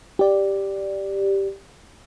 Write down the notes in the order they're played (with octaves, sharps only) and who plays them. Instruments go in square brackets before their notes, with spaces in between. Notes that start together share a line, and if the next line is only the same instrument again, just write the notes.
[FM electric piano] G4 D5